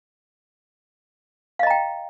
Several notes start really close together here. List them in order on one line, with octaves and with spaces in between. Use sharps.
F5 D#5 A#5 G5